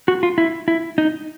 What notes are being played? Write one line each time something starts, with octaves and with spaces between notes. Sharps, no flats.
F#4
F4
E4
E4
D#4